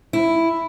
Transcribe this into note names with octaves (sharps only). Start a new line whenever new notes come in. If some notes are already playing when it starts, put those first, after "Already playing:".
E4